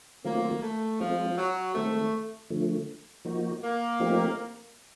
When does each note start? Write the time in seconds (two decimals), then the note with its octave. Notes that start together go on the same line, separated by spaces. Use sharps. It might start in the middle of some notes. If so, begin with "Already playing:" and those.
0.25 D#3 F#3 A3 A#3 C4 F4
0.62 A3
1.00 F3 G#3 C4 F4
1.37 F#3
1.74 D#3 G#3 A3 C4
2.50 D3 F3 A3
3.25 F3 A#3 D#4 F#4
3.63 A#3
4.00 F3 A3 C4 D#4 G4